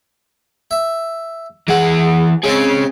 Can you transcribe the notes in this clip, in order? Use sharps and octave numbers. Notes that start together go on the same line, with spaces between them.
E5
E3 G#3 F#5
G#3 C4 C#4 G#4